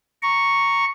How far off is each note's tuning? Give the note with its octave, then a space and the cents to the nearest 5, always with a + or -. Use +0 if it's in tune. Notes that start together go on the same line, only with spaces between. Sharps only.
A#5 +0 C#6 +0